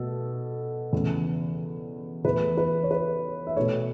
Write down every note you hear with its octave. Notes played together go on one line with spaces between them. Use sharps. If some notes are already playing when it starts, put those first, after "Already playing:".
Already playing: B2 A3 A4
E2 C#3 A3
E2 E3 A3 B4
B4
C#5
B4
E5
B2 A3 C#5